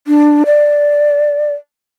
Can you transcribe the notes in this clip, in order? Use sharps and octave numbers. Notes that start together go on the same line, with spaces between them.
D4
D5